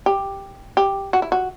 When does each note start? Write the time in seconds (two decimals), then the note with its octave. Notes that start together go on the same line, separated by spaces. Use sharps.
0.06 G4
0.77 G4
1.13 F#4
1.22 E4
1.32 F#4